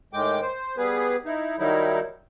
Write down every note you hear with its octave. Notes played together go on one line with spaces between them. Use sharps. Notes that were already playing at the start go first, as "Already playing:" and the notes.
A2 D#3 G#3 G5 D6
C5
G3 B3 G#4 B4
D#4 E4
D#3 F#3 G3 D#4 E4